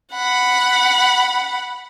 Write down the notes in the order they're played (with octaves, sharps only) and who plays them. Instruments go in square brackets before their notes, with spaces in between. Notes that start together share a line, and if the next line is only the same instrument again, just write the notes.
[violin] F#5 B5